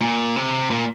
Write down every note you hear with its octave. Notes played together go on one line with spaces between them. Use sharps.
A#2
C3
A#2